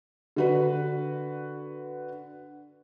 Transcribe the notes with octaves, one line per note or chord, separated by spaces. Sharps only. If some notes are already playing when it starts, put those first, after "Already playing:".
D3 F#4 B4